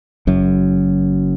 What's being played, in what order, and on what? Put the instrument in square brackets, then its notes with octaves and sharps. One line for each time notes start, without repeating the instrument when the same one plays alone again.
[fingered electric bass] F#1 F#2